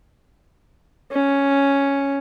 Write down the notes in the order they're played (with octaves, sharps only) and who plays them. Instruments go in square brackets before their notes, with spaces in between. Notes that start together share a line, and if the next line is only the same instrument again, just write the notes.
[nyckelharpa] C#4